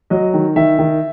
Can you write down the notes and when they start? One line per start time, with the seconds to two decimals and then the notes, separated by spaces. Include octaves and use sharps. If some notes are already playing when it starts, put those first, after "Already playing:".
0.10 F#3 D#5
0.34 D#3
0.56 D#3 E5
0.79 D#3